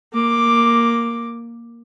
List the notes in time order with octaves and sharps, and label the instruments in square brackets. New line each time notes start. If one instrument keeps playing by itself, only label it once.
[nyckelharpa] A#3 D6